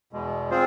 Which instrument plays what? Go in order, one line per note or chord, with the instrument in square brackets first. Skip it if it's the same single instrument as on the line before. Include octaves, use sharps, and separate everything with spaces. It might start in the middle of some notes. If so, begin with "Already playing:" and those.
[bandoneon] E2 B2 G#3
C4 F4 G#4 C5